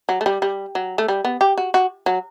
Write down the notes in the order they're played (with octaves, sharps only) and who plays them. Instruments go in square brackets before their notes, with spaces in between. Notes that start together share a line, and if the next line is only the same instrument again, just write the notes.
[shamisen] F#3
A3
G3
G3
F#3
A3
G3
B3
G4
F#4
F#4
F#3